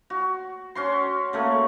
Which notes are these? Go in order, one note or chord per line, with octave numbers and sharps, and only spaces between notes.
F#4
C#4 F#4 C6
C#3 A3 A#3